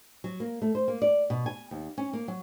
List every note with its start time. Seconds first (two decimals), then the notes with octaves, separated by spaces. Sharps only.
0.24 F#3
0.40 A#3
0.62 A3
0.75 C5
0.88 A#3
1.02 D5
1.30 B2
1.46 G#5
1.71 D#2
1.98 C#4
2.13 A#3
2.28 F#3